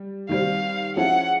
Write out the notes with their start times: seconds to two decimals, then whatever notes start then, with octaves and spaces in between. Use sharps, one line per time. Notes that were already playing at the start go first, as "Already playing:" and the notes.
Already playing: G3
0.29 D#3 G3 C4 F5
0.96 F3 G#3 C#4 E4 F#5